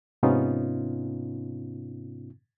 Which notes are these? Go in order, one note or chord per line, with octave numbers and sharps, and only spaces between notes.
G#2 C3 B3 C#4 D#4 F4